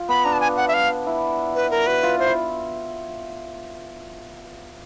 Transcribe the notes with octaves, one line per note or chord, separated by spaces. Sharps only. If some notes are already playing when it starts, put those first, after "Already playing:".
Already playing: F4
B3 B5
D4 A#5
A5
G#5
F#5
E5
F5
E4
B4
A#4
F#4 B4
F4
E4 C5
F4